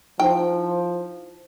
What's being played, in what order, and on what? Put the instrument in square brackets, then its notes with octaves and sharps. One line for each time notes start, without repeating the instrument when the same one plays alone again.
[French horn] F3 [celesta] D#4 E4 C5 [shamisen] G5